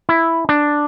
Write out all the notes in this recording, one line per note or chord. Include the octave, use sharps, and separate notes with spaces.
E4
D4